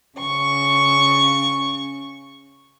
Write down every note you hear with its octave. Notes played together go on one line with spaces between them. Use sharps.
C#3 C#6